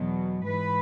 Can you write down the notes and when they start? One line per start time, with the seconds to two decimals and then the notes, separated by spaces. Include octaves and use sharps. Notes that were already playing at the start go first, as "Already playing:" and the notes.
Already playing: E2 B2 F#3
0.45 G#2 E3 B4